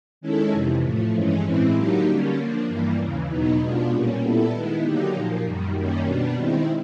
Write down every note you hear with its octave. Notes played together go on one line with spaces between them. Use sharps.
D#3 G#3 C#4 E4 A4
F2 C3 E3
A2 F3 A3
G2 E3 G#3 C#4
A2 E3 G#3 C4 E4
D3 F#3 A#3 D#4 G4
D3 G3 A#3 C#4
F3 A#3 D4
G2 E3 G3 A#3
D#2 C#3 E3
E2 B2 F#3 B3 D#4
B2 G#3 B3 D4 F4
A#2 G3 A#3 C#4
A#2 G3 B3 E4 A4
D#3 G#3 B3 E4
D3 F#3 A#3 D#4 G4
A#2 F3 A#3
F#2 D#3 G3
F#2 D#3 G3 A#3 C#4
B2 G3 B3 D4
D#3 G#3 C4 E4